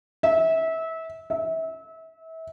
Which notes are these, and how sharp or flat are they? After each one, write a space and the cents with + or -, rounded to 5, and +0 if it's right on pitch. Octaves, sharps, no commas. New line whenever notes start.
E5 -25
E5 -30